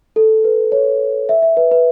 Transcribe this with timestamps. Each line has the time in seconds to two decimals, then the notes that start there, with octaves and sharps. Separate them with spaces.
0.16 A4
0.44 B4
0.72 C#5
1.29 E5
1.42 E5
1.57 B4
1.72 B4